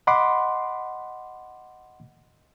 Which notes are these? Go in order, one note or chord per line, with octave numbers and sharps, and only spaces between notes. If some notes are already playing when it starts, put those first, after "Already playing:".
D#5 F#5 B5 C6 D6